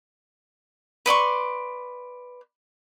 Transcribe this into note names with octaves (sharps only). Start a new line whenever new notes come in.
B4 D5 C6 C#6